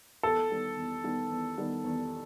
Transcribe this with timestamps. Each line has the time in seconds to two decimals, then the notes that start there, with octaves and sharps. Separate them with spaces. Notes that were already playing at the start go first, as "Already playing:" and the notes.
0.23 E2 A4
0.50 D#3 G3 B3
0.77 E2
1.04 D#3 G3 B3
1.31 E2
1.58 D#3 G3 B3
1.84 E2